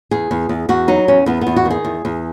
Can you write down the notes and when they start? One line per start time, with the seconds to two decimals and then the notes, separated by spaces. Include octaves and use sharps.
0.11 E2 G#4
0.31 E2
0.49 E2
0.69 E2 F#4
0.88 F#3 D#4
1.08 E2 C#4
1.26 E2 B3
1.41 B3
1.47 E2
1.56 F#4
1.65 D#3
1.70 G#4
1.85 E2
2.05 E2